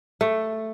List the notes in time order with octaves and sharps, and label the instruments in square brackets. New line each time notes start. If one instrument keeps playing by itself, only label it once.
[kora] A3